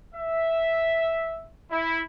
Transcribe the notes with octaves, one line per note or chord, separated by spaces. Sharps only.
E5
E4